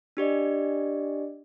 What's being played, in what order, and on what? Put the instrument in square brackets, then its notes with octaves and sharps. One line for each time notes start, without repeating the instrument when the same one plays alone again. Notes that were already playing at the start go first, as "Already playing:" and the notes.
[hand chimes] D4 G4 D5 D#5